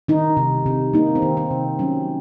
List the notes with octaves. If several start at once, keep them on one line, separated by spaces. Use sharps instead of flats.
D#3 D#4
C3
C3
A#3 D#4
C4
D#3
C4
C3
F#3 C#4